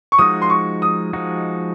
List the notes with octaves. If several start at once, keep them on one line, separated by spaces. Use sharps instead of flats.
C#6
F3 G#3 D#4 F#4 D#6
C6
C#6
D#6
F3 G#3 D#4 F#4